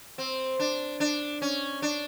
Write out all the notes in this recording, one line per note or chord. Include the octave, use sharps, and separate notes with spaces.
C4
D4
D4
C#4
D4